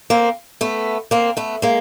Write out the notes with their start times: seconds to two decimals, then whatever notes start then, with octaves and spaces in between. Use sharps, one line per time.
0.10 A#3 C4
0.61 A3 B3
1.11 A#3 C4
1.37 A3 B3
1.62 G#3 A#3